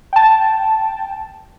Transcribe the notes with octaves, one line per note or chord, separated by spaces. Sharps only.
G5 A5